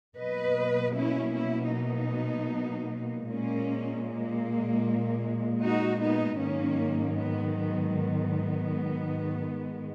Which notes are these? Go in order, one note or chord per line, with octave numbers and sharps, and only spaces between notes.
B2 F#3 A#3 B4 D#5
C#4 E4
C#4 E4
B3 D#4
A#2 G#3 A#3 C#4
A#3
D#4 F#4
B3 D#4
G#2 D#3 F#3 A#3 C#4
B3
B3
B3
G#2 D#3 G#3